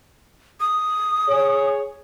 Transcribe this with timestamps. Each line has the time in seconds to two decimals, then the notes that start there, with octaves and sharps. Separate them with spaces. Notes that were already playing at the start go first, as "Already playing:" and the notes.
0.60 D#6
1.28 G#4 C#5